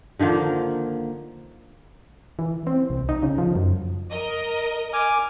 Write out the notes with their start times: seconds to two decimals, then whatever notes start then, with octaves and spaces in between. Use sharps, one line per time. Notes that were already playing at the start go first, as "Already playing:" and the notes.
0.19 D3 D#3 F3 A#3
2.39 E3
2.67 C4
2.90 C2
3.09 D#4
3.23 C#3
3.38 F3
3.55 F#2
4.11 A#4 D#5
4.93 G#5 D6 F6